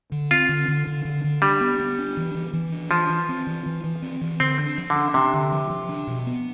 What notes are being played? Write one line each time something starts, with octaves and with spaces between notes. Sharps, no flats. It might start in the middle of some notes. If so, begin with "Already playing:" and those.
D3
C4 F4
D3
D3
D3
D3
D3
G3 D4
B3
B3
D4
E3
E3
E3
D4
E3 F3
E3
C4
E3
E3
E3
C4
E3
D3 C4
D4
F3
D3
D4
C3 D4
D3
F3
F3
D4
B2
B3